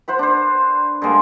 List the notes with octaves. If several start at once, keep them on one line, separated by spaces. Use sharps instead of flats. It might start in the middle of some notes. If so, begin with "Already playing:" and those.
C5 F#5 B5
D4 C5
D3 G3 G#3 A#3